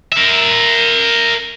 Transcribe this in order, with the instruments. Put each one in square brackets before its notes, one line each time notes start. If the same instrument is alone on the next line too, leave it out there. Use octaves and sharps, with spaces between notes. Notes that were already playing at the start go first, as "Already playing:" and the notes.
[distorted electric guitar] A#4 E5